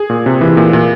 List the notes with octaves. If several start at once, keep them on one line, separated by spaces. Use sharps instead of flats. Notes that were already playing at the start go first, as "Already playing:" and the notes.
Already playing: G#4
A#2
C3
E3
A#2
A#2